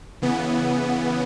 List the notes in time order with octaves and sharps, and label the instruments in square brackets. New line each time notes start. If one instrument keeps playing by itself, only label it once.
[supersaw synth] C#3 E3 B3